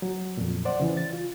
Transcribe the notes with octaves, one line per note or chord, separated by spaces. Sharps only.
F#3
F2 A#2
C5 D5 F#5
C#3 E3
A6
F4